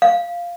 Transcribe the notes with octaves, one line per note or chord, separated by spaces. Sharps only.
F5